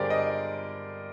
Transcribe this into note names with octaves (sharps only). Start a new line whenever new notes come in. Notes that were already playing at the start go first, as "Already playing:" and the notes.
Already playing: G2 D3 G4 G#4 A#4 C5 D5
D#5